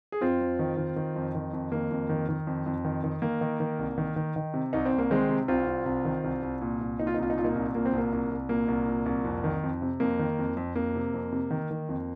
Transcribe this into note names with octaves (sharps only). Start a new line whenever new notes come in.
G#4
F2 C4 F4
F2
D#3
D#3
D#3
F2
D#3
F2
D#3 A#3
F2
D#3
D#3
F2
F2
D#3
D#3
D#3 A#3
D#3
D#3
C2
D#3
D#3
D#3
C3
C2 D#4
C4
C2
A#3
D#3 G#3 C4
C3
C2 C4 F4
C2
C2
D#3
C2
C2
A#2
C2
A#2 D#4
F4
D#4
C2 F4
D#4
A#2 F4
A#3 D#4
C2
A#2 A#3
C4
C2 A#3
C2
C2
A#2 A#3
C2
A#2
C2
F2
D#3
F2
C3
F2 A#3
D#3
F2
F2
F2 A#3
C3
F2
C3
D#3
D#3
F2